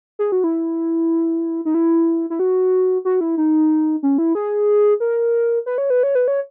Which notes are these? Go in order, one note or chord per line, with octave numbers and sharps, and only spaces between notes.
G#4
F#4
E4
D#4
E4
E4
F#4
F#4
E4
D#4
C#4
E4
G#4
A#4
B4
C#5
B4
C#5
B4
C#5